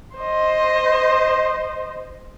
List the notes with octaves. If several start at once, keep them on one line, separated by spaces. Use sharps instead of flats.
C5 D#5